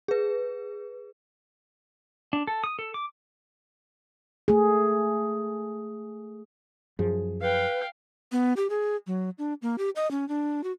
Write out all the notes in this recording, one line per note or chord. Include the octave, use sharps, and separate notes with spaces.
G#4 B4
D4
A4
D#6
A4
D6
A3 G#4
F#2 F3 G#4
B4 F5 G5
B3
G4
G#4
F#3
D4
A#3
G4
D#5
C#4
D4
F#4